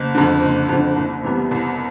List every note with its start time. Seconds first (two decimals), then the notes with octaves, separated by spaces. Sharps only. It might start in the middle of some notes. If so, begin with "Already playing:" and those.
Already playing: F#1
0.15 F2 D3
0.42 F#1
0.69 F2 D3
0.96 C2
1.23 C3 E3 G3 B3
1.51 C2